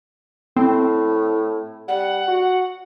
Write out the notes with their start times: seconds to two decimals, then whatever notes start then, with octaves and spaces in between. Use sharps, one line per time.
0.56 A2 C4
1.88 G3 F#5
2.28 F#4